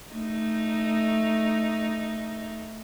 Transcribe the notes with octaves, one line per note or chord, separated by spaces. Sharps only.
A3 D#4